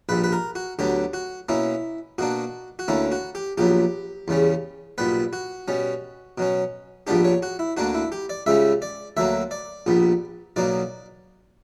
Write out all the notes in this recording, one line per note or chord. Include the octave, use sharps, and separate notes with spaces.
A#1 A#2 G3 B4
B4
A#4
F#4
D2 D3 F#3 B3 G4
F#4
B2 A#3 C#4 E4
B2 A#3 D4 F#4
F#4
D2 D3 A#3 C#4 E4
F#4
G4
A#1 A#2 F#3 B3 G4
E2 C#3 G3 C#4
B1 A#2 G3 B3 B4
F#4
B2 G3 C#4
B2 F#3 C#4
A#1 A#2 G3 B3 D4 G4
C#5
F#4
E4
D2 D3 A#3 D4 F#4
E4
G4
D5
C#2 C#3 G3 C#4 E5
D5
D2 D3 F#3 A#3 E5
D5
A#1 A#2 G3 B3
B1 B2 F#3 A#3 D5